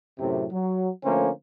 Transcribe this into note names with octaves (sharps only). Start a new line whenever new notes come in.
F#2 A2 C3
F#3
D3 F3 A3 A#3 C#4 C5